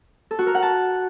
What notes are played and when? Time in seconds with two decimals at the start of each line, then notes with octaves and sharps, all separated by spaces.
0.31 A4
0.39 F#4
0.47 A#4
0.55 F#5
0.63 A5